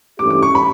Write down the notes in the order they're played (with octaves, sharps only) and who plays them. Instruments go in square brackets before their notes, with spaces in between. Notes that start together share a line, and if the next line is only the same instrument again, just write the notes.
[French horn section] G2 E3 A3 C#4 G4 [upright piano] D6
[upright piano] D6
C#6
B5